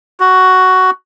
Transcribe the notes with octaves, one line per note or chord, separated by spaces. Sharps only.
F#4